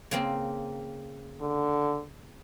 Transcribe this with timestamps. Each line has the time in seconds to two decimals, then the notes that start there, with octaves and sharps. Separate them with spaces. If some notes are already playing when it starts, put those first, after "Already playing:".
0.11 C#3 A#3 C4
1.41 D3